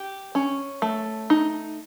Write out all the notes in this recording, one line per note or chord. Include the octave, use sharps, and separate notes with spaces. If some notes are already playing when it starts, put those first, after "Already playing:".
Already playing: G4
C#4
A3
D#4